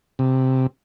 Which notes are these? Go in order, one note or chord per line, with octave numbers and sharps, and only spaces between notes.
C3